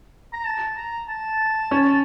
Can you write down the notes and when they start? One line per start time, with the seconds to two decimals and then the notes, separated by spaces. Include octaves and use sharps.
0.33 A#5
0.45 A5
0.76 A#5
1.08 A5
1.71 C#4